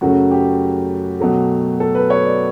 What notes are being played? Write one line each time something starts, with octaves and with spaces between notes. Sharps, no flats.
F#2 C#3 F#3 A3 F#4
G4
B2 F#3 A3
A4
B4
C#5
D5